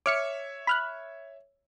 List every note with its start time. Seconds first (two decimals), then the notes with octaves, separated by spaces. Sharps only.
0.06 C#5 E5 D6 F6 C#7
0.67 B5 F6 F#6